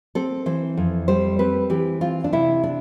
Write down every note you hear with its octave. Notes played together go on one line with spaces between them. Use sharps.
C4 A4
E3 C5
F2
G3 C5
C4 B4
E3 G4
C4 F4
D4
C3 E4
D4